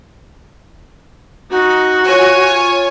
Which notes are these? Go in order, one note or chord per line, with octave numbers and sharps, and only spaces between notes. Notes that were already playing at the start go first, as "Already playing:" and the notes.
D#4 F#4
F4 C#5 G#5